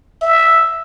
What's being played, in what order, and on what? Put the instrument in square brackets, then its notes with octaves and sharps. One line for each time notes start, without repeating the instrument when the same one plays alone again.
[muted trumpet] E5